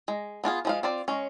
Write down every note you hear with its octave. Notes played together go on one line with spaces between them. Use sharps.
G#3
B3 D4 F4 G#4
F3 G#3 F5
C4 F4 D5
G#3 C#4